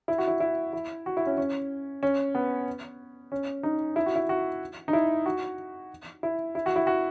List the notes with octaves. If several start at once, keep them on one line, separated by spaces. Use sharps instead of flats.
E4
F#4
E4
E4
E4
F#4
E4
C#4
C#4
C#4
B3
C#4
D#4
E4
F#4
E4
F#4
D#4
E4
F#4
E4
E4
F#4
E4
F#4